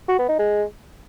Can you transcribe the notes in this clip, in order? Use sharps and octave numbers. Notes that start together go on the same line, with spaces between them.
F#4
B3
D#4
G#3